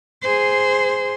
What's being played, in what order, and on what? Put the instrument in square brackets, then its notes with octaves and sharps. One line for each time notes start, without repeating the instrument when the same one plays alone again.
[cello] G#4 C5